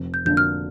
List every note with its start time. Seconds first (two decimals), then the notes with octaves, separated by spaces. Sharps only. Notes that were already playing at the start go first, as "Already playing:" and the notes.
Already playing: F1
0.14 G6
0.25 F2 D3 A#3 D4 G6
0.37 F6